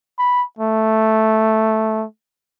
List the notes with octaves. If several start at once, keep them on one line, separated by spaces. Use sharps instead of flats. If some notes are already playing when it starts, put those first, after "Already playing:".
B5
A3